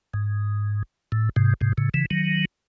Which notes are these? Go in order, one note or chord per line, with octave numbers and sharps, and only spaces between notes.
G#2
A2
G#2 C3
G#2 C3
A2 C#3
C#3 E3
D#3 F#3